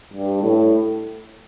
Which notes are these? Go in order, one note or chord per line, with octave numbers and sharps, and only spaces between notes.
G2
A2